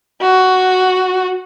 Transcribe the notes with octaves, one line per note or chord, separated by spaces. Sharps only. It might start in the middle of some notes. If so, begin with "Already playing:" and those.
F#4